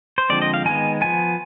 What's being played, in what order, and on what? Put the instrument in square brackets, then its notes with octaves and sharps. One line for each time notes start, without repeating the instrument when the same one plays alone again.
[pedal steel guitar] C5
D3 F3 G#3 C4 D5
D#5
F5
D#3 G#3 B3 G#5
F3 B3 G#5